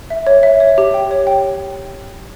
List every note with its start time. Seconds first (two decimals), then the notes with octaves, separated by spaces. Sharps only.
0.10 E5
0.27 C#5
0.43 E5
0.60 C#5
0.78 G4
0.94 G5
1.11 C#5
1.27 G5